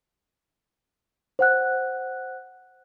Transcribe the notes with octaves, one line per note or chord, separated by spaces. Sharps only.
C5 F#5 F#6